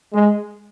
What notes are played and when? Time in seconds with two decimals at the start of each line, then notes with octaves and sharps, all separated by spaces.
0.13 G#3